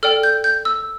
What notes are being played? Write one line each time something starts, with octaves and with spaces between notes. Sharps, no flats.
A4 D5 G5 F6
G6
G6
E6